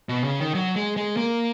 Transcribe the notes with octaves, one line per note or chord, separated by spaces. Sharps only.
B2
C#3
D#3
F#3
G#3
G#3
A#3